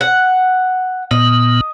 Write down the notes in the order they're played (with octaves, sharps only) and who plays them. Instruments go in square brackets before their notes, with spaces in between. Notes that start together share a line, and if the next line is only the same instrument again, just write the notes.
[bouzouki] F#5
[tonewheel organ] A#2 B3 [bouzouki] D#5